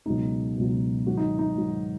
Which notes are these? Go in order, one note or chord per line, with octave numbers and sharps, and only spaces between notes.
C#2 B2 F#3 D#4
C#2 B2 F#3
G#2 D#3 F#3 F#4
D#4
D#4
G#2 D#3 F#3